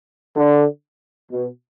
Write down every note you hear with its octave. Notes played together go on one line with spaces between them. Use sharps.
D3
B2